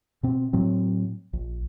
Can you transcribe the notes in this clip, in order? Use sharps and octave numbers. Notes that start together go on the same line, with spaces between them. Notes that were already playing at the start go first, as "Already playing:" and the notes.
B2 C4
A2 F#3 C4
A#1